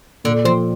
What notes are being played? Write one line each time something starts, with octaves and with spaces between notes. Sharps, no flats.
A#2 D3
F3 C4